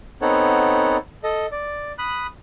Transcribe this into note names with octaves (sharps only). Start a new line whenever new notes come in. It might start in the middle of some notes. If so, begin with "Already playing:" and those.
B3 C4 D#4 A4 C#5 F#5
A4 D#5
D5
B5 D#6 F#6